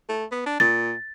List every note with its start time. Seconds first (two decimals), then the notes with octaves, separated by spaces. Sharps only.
0.09 A3
0.31 B3
0.46 D4
0.60 A#2 A6